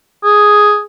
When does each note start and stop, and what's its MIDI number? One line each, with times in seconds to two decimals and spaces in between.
0.24 0.81 68